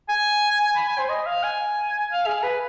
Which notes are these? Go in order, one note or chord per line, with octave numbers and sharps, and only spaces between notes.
G#5
B5
G#5
C5
D#5
F5
G#5
F5
G#4
B4